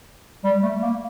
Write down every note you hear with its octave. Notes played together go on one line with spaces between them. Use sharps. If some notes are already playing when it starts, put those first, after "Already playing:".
G3
A3
A#3